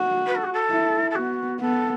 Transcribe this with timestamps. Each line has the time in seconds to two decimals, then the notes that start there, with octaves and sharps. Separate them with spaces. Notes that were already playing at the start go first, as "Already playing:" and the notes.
Already playing: F#4
0.26 B4
0.35 A4
0.44 F#4
0.52 A4
0.71 E4
1.10 A4
1.15 B3 F#4
1.60 B3 A4